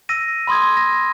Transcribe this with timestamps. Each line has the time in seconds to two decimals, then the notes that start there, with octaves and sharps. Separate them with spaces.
0.09 E6 A#6 D#7
0.47 B5 C6 D#6 G#6
0.77 A#6